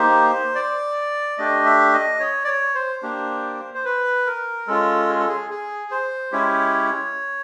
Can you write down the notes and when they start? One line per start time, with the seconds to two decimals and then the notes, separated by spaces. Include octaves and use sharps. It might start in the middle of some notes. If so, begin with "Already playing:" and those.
Already playing: A#3 D#4 G4 C5
0.55 D5
1.38 A3 D4 G4 D#5
1.66 E5
1.94 D#5
2.20 C#5
2.44 D5
2.47 C#5
2.75 C5
3.03 A#3 D4 G4
3.74 C5
3.85 B4
4.26 A#4
4.67 G#3 C#4 F4 A4
5.09 G#4
5.19 A4
5.29 G#4
5.50 G#4
5.91 C5
6.32 G#3 C#4 E4 G4 C#5